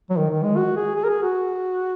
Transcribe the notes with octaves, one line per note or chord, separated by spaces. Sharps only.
F#3
D#3
D#3
G#3
F#4
G#4
G#4
A#4
G#4
F#4